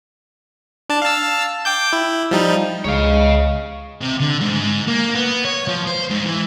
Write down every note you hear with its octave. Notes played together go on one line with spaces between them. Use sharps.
D4 A5
F5 A5 E6
G5 D6 G6
E4
F3 G3 D#4
C#2 G#3 C#5 F5
C3
D3
G#2
A#3
B3
C#5
F3
C5
G#2
E3